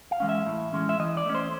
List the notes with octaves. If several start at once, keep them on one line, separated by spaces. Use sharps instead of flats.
F5
E3 G#3 C#4
E5
A2
E3 G#3 C#4
E5
E3 D#5
D5
A3 C#4
C5